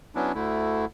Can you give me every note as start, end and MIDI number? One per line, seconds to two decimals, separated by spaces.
0.15 0.32 54
0.15 0.32 59
0.15 0.32 61
0.15 0.32 62
0.15 0.32 64
0.35 0.85 38
0.35 0.85 50
0.35 0.85 57
0.35 0.85 64